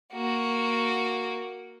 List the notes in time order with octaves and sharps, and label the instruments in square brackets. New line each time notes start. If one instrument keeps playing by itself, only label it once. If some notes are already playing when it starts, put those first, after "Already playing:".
[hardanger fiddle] A#3 F#4